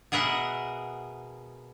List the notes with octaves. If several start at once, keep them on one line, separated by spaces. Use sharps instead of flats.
B2 G#4 A#4 E5 F#5